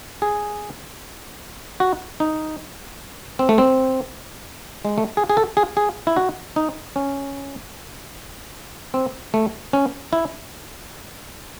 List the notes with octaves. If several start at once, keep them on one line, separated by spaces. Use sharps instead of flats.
G#4
F#4
D#4
C4
A3
C4
G#3
A3
G#4
G#4
A4
G#4
G#4
E4
F#4
D#4
C#4
C4
A3
C#4
E4